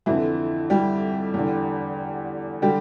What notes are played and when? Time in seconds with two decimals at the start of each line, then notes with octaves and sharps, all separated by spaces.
0.06 F2 D3 E3 E4
0.70 G3 G4
1.34 E2 D3
2.62 D3 G3 G4